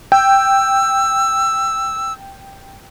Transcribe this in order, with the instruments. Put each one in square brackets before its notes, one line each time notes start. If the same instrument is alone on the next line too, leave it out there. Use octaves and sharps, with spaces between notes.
[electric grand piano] G5 [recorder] E6